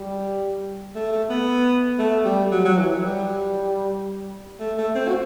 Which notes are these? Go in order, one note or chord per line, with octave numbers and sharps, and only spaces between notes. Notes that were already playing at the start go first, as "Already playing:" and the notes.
Already playing: G3
A3
A3
B3
A3
G3
F#3
F#3
E3
F#3
G3
A3
A3
C4
F#4